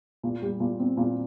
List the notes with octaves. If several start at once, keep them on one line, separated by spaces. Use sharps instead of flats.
A#2
G3
A#2
C4
A#2